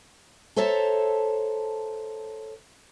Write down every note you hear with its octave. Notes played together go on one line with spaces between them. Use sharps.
A4 C5 C#5 E5 A5 A#5